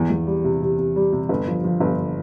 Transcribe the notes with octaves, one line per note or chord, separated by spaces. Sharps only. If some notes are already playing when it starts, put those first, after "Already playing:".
Already playing: E2
E2
G3
C3
C3
C3
G3
C3
G1
F3
F3
G1